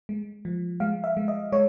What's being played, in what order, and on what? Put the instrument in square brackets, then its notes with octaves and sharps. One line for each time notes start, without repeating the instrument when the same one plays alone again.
[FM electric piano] G#3
F3
G#3 F5
E5
G#3
D#5
G#3 C#5